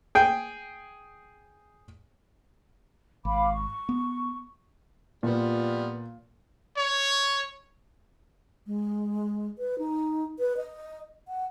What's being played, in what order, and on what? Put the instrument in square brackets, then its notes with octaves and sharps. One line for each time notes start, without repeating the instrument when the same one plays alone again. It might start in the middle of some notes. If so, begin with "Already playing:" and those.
[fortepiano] G#4 G5
[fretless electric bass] G#1 [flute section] F5 B5 D6
[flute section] C#6
[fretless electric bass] B3
[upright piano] A#2 [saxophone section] F3 G3 B3
[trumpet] C#5
[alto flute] G#3
B4
D#4
B4
D#5
F#5